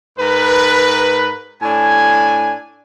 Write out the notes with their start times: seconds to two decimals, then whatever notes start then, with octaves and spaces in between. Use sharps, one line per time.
0.19 G#2 A#4 B4
1.62 A2 D4 G#5